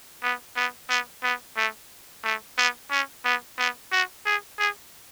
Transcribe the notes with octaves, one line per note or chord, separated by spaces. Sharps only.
B3
B3
B3
B3
A3
A3
B3
C#4
B3
B3
F#4
G#4
G#4